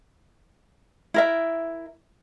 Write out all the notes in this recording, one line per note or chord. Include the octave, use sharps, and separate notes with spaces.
E4 A#4 E5